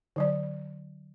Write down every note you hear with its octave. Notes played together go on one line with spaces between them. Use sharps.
D3 F#3 D5